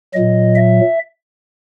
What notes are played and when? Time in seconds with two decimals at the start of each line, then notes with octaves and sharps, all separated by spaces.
0.14 A#2 F#3 D#5
0.55 E5